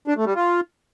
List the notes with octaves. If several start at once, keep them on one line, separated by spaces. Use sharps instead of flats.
D4
A3
G3
F4